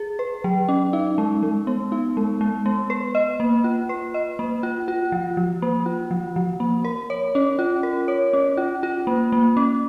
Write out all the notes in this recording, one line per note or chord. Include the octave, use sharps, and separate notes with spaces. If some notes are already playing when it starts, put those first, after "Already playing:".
Already playing: G#4
B4
F#3
C#4
D#4
G#3
G#3
B3
D#4
G#3
G#3
B3
B4
D#5
A#3
F4
B4
D#5
A#3
F4
F4
F3
F3
A#3
F4
F3
F3
A#3
A#4
C#5
C#4
F4
A#4
C#5
C#4
F4
F4
A#3
A#3
C#4